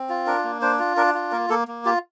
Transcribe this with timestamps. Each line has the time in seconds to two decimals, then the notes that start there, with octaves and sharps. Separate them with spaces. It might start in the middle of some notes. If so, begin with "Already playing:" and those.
Already playing: C4
0.09 F4
0.27 D4 A#4
0.44 A#3
0.62 D4 C5
0.79 F4
0.97 D4 A#4
1.14 F4
1.32 A#3 A#4
1.50 A#3 A4
1.68 A#3
1.85 F4 G4